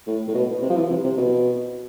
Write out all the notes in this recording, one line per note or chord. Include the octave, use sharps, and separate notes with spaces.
A2
A2
B2
C3
F3
E3
C3
C3
B2